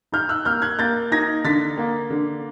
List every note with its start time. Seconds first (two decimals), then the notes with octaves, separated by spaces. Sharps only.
0.12 D#4 F6 G6
0.29 E6 F#6
0.45 A#3 F6 G6
0.62 F#6 G#6
0.79 A#3 G6 A6
1.12 D#4 G#6 A#6
1.44 D3 A6 B6
1.78 A#3
2.10 D3